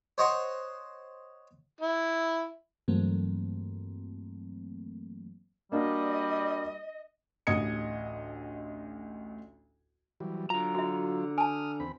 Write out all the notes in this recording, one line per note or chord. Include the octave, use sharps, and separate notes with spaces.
C5 C#5 D#5 F#5 C6 C#6
E4
G2 E3 F#3 A3 A#3 C4
G3 A#3 D4 F#4 D#5
A1 D2 D#5 D#6 G#6 C#7
E3 F#3 G3
D3 F#3 F4 A#5
F#4 E5
G#5 A5 D#6 F6
E2 C4 B5